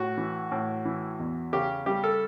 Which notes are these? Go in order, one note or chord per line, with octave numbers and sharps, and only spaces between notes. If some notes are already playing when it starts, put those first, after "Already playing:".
Already playing: A2 F#4
E3
A2
E3
E2
C#3 G4
G3 G4
A4